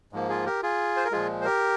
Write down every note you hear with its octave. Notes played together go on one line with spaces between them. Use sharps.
G#2 F3 A#3
F4 G#4
G4 A#4
F4 G#4
C5
A#4
A#2 F3 G#3 F4 G#4
C5
G4 A#4